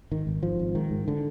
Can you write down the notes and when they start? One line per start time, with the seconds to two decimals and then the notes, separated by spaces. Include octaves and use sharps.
0.11 G#1 D#3
0.27 G#1
0.43 G#1 F3
0.59 G#1
0.75 G#2 D#3
0.91 G#2
1.08 D3